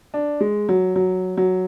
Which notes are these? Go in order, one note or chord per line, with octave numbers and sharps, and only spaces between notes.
D4
G#3
F#3
F#3
F#3